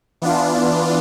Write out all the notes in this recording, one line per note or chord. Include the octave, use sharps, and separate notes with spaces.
E3 B3 D4 F4